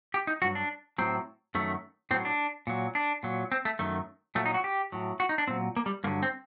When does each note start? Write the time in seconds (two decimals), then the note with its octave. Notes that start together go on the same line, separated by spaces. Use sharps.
0.14 G4
0.27 D#4
0.42 G2 F#3 F#4
0.55 D4
0.98 A2 F#3 C4
1.55 F#2 D#3 F#3 A3
2.11 A2 F#3 C4
2.25 D4
2.67 A#2 F#3
2.95 D4
3.23 A#2 F#3
3.52 C4
3.65 A3
3.79 F#2 D#3 F#3 A3
4.35 A#2 F#3 A3
4.46 D#4
4.54 F#4
4.64 G4
4.92 A2 F#3
5.20 F#4
5.29 D#4
5.38 D4
5.48 A#2 F#3 C4
5.76 A#3
5.86 G3
6.04 G2 D3 F#3 A#3
6.23 C4